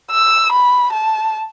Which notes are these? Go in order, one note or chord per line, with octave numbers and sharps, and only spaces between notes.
E6
B5
A5